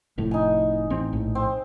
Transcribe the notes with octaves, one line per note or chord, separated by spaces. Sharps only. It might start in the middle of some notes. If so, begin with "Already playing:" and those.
F1 F2 A2
D#4 G#5
A1 C4
A#1 A2
C4